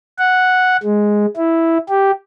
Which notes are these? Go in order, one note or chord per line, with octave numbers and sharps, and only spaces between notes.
F#5
G#3
E4
G4